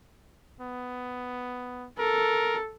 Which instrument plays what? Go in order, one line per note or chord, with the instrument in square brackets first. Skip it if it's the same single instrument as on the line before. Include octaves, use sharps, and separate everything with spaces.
[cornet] B3
[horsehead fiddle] A4 [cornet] A#4